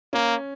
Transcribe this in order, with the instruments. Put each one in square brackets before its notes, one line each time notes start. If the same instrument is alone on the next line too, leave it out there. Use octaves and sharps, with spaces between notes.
[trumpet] A#3 [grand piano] C#4